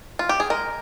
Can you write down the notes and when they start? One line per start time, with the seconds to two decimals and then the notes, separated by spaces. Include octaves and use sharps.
0.19 F4
0.29 G4
0.40 G#4
0.50 G#3 A#4